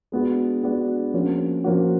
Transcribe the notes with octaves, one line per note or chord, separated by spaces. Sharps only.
G#3 B3 D4 F#4
G#3 B3 D4 F#4
F3 A#3 C#4 F#4
F3 A#3 C#4 F#4